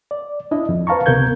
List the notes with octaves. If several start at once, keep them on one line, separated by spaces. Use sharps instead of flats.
D5
D4 E4 D#5
F2
B4 C5 F5 A5 A#5 C#6
C#2 C3 B3 A#4 G6 G#6